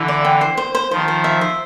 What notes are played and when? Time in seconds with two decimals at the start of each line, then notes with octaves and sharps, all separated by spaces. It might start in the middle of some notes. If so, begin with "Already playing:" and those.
Already playing: D3 E3
0.08 D5
0.25 G5
0.41 C5
0.57 C5
0.75 C5
0.91 D#3 F3 C5
1.08 C5
1.24 E5
1.41 C5